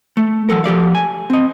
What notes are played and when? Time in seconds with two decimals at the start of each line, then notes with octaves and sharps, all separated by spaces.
0.17 A3
0.49 E3 F#3 A4 A#4
0.64 F3 G4 D5 F5
0.95 G#5
1.30 C4 D#5